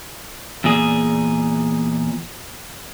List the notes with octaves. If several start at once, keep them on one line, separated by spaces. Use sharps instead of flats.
E2 A#2 G#4